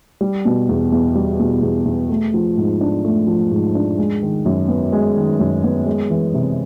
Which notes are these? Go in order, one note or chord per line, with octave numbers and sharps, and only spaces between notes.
G3
B2
E2
E2
G3
B2
E2
E2
A3
F3
G#2
D4
A3
F3
G#2
D4
G#3
D#3
F#2
B3
G#3
D#3
F#2
B3
G#3
E3
C3